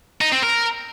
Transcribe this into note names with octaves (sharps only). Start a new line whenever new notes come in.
D#4
C4
A#4